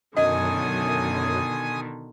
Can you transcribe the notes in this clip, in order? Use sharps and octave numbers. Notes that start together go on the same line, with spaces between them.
F#2 B2 D3 D#3 D#5 G#5 D#6